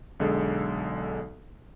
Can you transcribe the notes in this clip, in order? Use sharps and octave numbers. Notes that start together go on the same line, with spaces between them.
B1 D3 G#3 A4